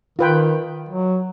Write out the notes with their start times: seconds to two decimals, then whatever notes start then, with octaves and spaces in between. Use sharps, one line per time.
0.19 D#3 F4 B4 G5
0.89 F#3